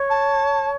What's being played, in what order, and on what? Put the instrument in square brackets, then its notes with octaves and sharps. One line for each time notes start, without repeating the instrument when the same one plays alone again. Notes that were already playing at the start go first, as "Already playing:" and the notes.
Already playing: [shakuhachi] C#5
[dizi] A5